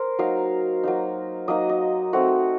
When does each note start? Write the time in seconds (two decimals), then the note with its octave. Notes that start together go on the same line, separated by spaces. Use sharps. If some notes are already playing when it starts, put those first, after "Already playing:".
Already playing: A#4 C5
0.19 F#3 A#3 D#4 F5
0.84 F#3 A#3 D#4
1.48 F#3 A#3 D#4 D#5
1.69 D#5
2.13 A3 C4 D#4 F#4